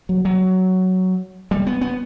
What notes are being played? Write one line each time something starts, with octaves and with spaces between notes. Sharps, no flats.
F#3
F#3
G3
B3
B3